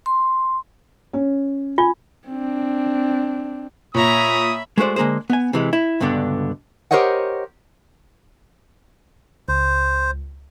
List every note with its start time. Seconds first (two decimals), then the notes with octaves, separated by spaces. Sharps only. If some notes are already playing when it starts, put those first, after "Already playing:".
0.06 C6
1.13 C#4
1.78 F4 G#5
2.27 C4 D4
3.94 A#2 C#5 E5 A#5 B5 D#6
4.78 G#3 A3 F#4 C5 D5
4.96 D3 G#3 A#3 G#4 C5
5.30 B3 G#5
5.53 C3 E3 G#3
5.73 E4
6.00 C#2 G2 B2 D3 B3 D4
6.91 G4 A#4 C5 C#5 D#5 F#5
9.48 C#2 C5